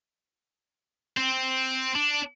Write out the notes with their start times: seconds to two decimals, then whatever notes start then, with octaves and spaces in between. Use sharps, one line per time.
1.17 C4
1.95 D4